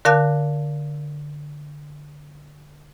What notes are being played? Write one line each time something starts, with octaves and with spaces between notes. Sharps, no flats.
D3 A#4 F5 A5 D6 F#6